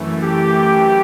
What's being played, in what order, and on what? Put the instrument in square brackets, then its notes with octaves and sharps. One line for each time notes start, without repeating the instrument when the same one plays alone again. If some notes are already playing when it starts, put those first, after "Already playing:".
Already playing: [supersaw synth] F#2 E3 A3
[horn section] G4